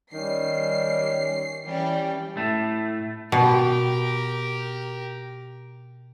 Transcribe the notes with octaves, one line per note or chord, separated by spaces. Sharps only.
D#3 G3 C#4 C7
E3 G3 C#4
A2 A3
B2 G4 A#4